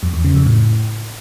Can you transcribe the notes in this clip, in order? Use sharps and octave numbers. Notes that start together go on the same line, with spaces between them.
F2
E2
C#3
F2
A2